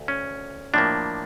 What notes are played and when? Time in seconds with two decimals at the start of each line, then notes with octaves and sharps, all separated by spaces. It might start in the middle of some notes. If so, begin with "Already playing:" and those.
Already playing: D2
0.08 C#4
0.74 A2 F3 A#3 D4